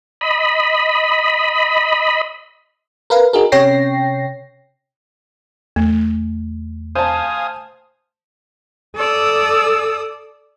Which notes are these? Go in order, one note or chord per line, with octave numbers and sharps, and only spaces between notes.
D#5 B5
A#4 B4 F5
D#4 F#4 G#4 A#4
C3 C#4 C#5 G5 A#6 C7
E2 A3
C5 F5 G#5 A5 D#6
A4 D5 D#6 E6